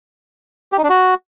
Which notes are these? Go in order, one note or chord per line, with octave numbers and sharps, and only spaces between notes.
G4
D#4
D4
F#4